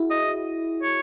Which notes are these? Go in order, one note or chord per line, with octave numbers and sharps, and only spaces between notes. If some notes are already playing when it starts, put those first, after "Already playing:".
Already playing: E4 F#4 G#4
D#5
C#5